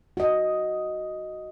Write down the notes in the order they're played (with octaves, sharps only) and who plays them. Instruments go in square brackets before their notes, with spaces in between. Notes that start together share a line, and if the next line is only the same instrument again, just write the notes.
[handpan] F#4 D#5